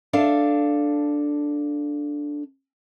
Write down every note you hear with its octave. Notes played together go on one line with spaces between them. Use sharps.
D4 A4 F5 A5